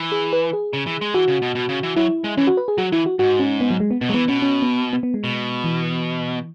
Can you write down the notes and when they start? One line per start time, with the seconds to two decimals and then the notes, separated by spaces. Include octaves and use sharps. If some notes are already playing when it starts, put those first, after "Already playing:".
Already playing: E3
0.12 G#4
0.33 B4
0.53 G#4
0.73 C#3
0.87 E3
1.01 G#3
1.14 E3 F#4
1.28 C#3
1.42 B2
1.55 B2
1.69 C#3
1.83 E3
1.96 F#3 E4
2.24 G#3
2.37 E3 C#4
2.47 F#4
2.57 B4
2.68 G#4
2.78 F#3 F#4
2.92 E3 E4
3.06 F#4
3.19 G#2 F#4
3.40 C#4
3.61 B3
3.70 F#3
3.80 G#3
3.91 B3
4.01 B2 B3
4.09 F#3 G#3
4.14 E3 B3
4.28 B2 C#4
4.42 C#4
4.62 B3
4.93 B3
5.03 B3
5.14 G#3
5.24 B2
5.64 E3